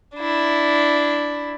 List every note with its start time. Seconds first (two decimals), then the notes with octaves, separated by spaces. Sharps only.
0.16 D4 E4